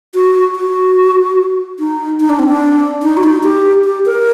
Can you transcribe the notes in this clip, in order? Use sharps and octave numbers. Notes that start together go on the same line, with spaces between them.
F#4
F#4
D#4
D#4
D4
C4
D4
D#4
F#4
D#4
G4
G4
A#4